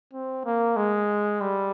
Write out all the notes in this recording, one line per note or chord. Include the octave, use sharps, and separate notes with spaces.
C4
A#3
G#3
G3